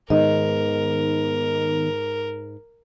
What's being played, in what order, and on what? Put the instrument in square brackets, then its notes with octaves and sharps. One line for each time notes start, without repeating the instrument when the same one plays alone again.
[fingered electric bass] G#2 [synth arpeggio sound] D#3 B3 D#4 [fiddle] A#4 [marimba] D#5